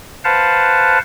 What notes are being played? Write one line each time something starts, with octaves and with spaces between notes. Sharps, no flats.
B4 C5 F5 F#5 A5